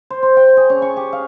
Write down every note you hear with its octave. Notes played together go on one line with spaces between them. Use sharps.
C5
C5
G5
G#4
C#4
C#6
G4
F5